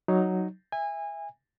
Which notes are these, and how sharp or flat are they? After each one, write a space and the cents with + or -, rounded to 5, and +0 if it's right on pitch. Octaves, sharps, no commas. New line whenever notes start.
F#3 +0 D#4 +0
E5 +0 G#5 -25